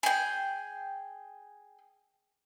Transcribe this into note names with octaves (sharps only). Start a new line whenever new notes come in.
G#4 G5